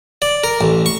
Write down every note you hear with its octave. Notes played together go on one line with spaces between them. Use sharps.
D5
A#4
A1
C#6